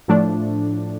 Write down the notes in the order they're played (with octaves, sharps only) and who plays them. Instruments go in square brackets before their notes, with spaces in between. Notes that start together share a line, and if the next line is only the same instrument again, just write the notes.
[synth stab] A2 F3 A3 D4